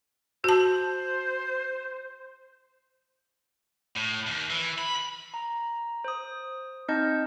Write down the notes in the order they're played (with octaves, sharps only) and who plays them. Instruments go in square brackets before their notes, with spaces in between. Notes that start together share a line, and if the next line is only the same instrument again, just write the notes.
[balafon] F#4 A5 [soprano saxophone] C5
[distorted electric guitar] A2
D#2
E3
B5
[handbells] A#5
C5 D#6
C4 D#4 D#5 A5 G6